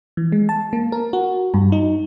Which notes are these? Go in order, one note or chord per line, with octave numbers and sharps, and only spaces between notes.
E3
G#3
A5
A#3
A#4
F#4
G2
D#4